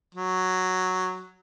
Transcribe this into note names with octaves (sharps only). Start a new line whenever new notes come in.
F#3